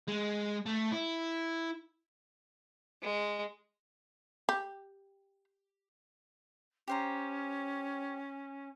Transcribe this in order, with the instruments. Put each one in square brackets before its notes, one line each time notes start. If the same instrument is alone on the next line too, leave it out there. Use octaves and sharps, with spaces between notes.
[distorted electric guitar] G#3
A3
E4
[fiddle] G#3
[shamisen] G4
[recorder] C#4 [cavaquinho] G4 C5 A#5